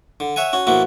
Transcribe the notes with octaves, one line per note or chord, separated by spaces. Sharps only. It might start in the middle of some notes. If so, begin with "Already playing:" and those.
D3
C#5 E5 F#5 G#5
C#4 F#4
B2 F3 A#3 E4 F#4